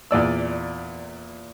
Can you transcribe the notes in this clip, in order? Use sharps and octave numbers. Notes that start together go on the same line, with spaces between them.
E2 A#2 D5 E6